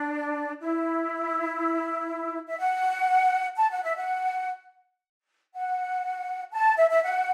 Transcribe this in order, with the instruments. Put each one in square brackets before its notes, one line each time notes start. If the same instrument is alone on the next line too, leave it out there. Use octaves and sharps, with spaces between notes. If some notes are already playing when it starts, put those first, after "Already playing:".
Already playing: [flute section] D4
E4
E5
F#5
A5
F#5
E5
F#5
F#5
A5
E5
E5
F#5